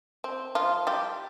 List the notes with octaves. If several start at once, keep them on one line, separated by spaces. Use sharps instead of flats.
C4
F3 F4
G3 G4